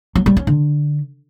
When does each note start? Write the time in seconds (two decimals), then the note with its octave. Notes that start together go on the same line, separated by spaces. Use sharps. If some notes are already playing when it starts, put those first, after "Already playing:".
0.15 F#3
0.26 G3
0.37 C#4
0.47 D3